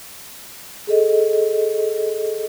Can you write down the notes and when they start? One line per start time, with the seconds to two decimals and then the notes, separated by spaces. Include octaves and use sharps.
0.87 G#4 A4 D#5